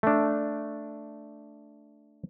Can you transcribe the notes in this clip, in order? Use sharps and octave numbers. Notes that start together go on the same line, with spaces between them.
A3 D4